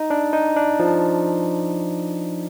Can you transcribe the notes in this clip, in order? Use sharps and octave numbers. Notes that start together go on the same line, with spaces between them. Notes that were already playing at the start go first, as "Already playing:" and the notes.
Already playing: D#4
D4
D#4
D4
F3